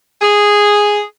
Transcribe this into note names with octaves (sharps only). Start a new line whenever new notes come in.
G#4